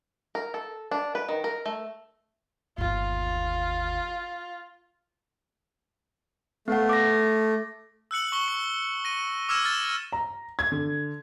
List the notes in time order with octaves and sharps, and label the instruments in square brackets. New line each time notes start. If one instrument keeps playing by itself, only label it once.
[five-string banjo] A#4
A4
D4
B4
D#3
A#4
A3
[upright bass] G1 D#2 [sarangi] F4
[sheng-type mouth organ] A3 [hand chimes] B3 F#5
[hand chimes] D6 A#6
[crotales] E6 F#6 C#7 F#7
C#6 G7
C#7
A#6 D#7
D6 E6 F6 G#6 A#6 E7
F6 A6 G7
[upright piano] A#5
G#6
D3